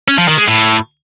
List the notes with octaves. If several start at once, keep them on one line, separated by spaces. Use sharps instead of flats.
C#4
F3
D#3
G#3
A2